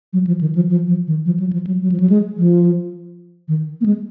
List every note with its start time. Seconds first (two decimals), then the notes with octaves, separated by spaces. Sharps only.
0.13 F#3
0.27 F3
0.41 D#3
0.55 F3
0.70 F3
0.87 F3
1.07 D#3
1.26 F3
1.40 F#3
1.53 F3
1.67 F#3
1.82 F#3
1.92 F3
2.00 F#3
2.09 G#3
2.37 F3
3.48 D#3
3.81 A#3
3.86 G#3